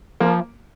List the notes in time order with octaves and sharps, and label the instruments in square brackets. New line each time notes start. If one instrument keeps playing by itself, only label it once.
[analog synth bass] F3 [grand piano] A#3